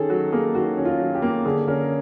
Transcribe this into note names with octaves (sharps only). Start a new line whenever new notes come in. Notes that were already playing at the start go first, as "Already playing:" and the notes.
Already playing: D#3 C#4 G#4 A4
F#3 F#4
A#3 G#4
D#3 F#4
C#4
F4
F#3
G4
A#3
D3 G#4
C#4 A#4